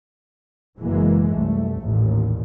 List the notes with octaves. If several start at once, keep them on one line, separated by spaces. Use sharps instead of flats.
F#1 B2 E3 G#3 A#3
C2 F#2 A3
A1 D#2 A#2